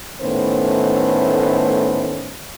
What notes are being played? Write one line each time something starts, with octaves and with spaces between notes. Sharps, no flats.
A2 D#3 A3 B3 C#4 C5